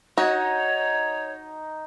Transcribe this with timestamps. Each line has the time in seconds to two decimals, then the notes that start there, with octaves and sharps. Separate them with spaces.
0.18 D#4 F#4 C#5